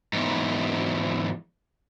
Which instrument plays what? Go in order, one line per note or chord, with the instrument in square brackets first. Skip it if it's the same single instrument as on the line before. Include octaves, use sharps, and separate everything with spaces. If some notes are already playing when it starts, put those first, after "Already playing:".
[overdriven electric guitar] E2 G#2